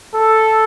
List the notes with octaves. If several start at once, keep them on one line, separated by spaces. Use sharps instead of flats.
A4